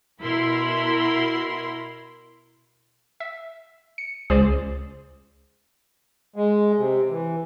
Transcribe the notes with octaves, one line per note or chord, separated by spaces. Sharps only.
B2 E4 A#4 B5 C6
E5
C#7
C#2 G#4 C5 D5
G#3
C3
E3